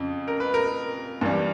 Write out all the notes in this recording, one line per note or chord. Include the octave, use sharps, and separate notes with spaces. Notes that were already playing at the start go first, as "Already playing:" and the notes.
Already playing: F2 C#3
A#4
B4
A#4
G2 E3 G3